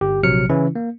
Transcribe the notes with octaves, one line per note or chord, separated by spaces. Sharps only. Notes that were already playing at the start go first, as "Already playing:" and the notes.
G1 G4
A#1 C3 F#3 F6 C#7
C#3 E3 C#4 E4
A#3